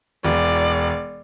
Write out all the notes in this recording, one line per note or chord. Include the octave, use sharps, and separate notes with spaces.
E1 D5